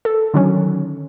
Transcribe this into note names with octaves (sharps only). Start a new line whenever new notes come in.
A4
D3 D#3 F#3 C#4